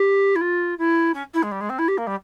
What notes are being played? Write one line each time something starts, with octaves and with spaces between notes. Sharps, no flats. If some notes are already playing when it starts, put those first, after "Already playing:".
Already playing: G4
E4
F4
E4
C#4
E4
G#3
G3
G#3
C4
E4
G4
A#3
G3